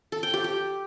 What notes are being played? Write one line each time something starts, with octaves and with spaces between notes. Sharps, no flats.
A4
G5
G4
G4